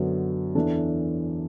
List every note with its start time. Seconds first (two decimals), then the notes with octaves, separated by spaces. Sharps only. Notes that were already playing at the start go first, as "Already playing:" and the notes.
Already playing: F#2 D3 F#3 B3
0.55 E2 E3 D4 A4